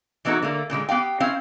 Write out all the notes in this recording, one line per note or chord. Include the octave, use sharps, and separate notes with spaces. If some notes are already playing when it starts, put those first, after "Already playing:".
E3 F#3 B3 D#4 F#4 A4
D3 A3 A#3
A#2 D3 F3 G#3
B3 G4 F5 G5
C4 C#4 E4 C5 F5